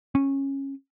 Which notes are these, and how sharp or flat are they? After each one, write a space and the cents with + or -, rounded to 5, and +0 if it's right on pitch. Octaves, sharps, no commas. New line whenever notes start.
C#4 -15